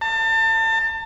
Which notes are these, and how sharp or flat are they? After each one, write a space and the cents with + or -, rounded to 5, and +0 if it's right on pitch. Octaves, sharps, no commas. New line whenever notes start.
A5 +30